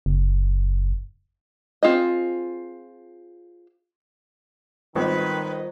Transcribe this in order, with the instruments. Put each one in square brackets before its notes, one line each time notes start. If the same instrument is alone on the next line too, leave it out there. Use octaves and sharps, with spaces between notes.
[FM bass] F#1
[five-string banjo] C4 F4 G#4 D#5
[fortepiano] G#1 [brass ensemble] D#3 D#5 [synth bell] G3 F4 C5 [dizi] B4